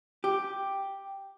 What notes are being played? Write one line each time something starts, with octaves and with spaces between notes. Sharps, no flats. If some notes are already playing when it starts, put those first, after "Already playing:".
G4